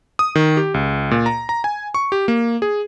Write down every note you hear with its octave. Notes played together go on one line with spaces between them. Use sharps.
D#6
D#3
G4
C#2
A#2
A#5
A#5
G#5
C#6
G4
A#3
G#4